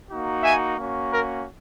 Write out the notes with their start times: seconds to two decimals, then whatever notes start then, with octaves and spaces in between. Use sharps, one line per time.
0.09 A#3 D#4 F#4
0.43 E5 G#5
0.78 A#3 C#4 F#4
1.11 A#4